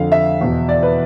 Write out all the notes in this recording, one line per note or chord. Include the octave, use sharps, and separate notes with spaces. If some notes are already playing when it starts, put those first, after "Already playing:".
Already playing: F2 D3 F5
E5
E2 B2
D5
B4